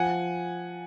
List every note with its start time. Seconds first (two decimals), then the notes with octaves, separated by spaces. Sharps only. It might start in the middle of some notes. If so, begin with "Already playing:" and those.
Already playing: F3 F#5 G#5